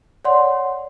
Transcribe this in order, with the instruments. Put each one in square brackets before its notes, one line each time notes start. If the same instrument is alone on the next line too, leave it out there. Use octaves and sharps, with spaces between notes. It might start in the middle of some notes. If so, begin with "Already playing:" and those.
[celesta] C#5 D5 F#5 C6